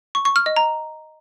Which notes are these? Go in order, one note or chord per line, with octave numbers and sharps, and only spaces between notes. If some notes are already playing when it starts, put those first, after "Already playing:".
C#6
C#6
F6
D#5
A#5